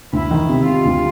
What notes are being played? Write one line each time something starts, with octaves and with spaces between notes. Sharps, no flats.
D2 E4
D#3
C3
G3 F4
D2